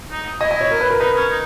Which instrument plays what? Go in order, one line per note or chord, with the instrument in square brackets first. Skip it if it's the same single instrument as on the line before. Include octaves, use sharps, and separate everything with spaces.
[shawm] D#4
[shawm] E4 [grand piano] D#5
[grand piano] D#5
C#5
A#4
B4
A#4
[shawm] D#4 [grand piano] B4
[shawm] C#4
D#4